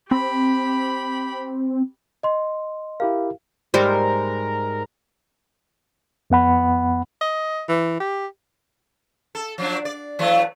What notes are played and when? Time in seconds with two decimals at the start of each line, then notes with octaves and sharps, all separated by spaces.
0.11 C4 G4 B5
2.23 D#5 C6
3.00 E4 G4 A#4 F5
3.74 G#2 G3 A#4 C5
6.30 F2 B3 F#5 B5
7.21 D#5
7.69 E3
8.00 G4
9.35 A4
9.58 F3 F#3 D4
9.85 D5
10.19 E3 F#3 A3